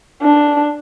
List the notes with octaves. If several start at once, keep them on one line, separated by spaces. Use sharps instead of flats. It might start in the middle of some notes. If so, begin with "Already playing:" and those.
D4